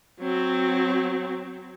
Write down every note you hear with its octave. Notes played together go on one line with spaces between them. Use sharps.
F#3 C4